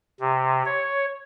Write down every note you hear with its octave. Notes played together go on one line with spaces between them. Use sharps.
C3
C#5